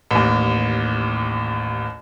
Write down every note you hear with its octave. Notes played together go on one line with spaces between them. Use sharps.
A1 D#2